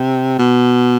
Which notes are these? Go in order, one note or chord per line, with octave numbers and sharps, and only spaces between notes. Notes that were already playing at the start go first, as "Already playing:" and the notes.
Already playing: C3
B2